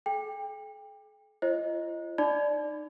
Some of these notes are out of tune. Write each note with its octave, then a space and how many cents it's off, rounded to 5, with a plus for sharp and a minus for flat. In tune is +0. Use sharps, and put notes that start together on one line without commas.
A4 -45 G5 +30
F4 -45 C5 +40 D#5 +0
D#4 -30 D5 +0 B5 +25